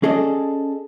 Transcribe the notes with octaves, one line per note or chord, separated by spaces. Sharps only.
C#4 G#4 A4 D5 D#5